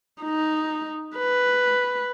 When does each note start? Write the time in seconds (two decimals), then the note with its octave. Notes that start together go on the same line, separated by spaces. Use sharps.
0.23 D#4
1.17 B4